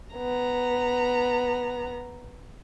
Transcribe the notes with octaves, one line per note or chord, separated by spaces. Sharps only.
B3 A#5